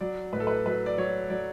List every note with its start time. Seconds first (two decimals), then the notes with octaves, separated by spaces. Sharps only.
0.01 F#3 D5
0.33 A2 B4
0.40 A4
0.47 B4
0.66 F#3 B4
0.86 D5
0.98 F#3 C#5
1.30 F#3 D5